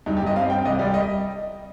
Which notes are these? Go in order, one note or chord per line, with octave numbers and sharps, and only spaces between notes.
G2 D#4
G4
G2
D#5
C4 F5
C4 G5
C2 D#5
G3 D5
D#5